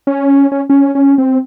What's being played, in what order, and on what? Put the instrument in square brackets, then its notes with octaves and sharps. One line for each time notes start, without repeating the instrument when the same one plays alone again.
[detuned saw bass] C#4
C#4
C#4
C#4
C4